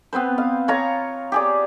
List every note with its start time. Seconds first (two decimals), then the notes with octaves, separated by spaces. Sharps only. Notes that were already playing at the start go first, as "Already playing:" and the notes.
0.13 B3 C4 B4 C5
0.38 F5
0.68 F4 C#5 A#5
1.32 G4 G#4 D5